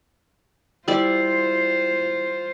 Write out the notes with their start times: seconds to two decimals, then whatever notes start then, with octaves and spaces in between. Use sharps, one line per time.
0.88 G3 E4 F4 C5 D5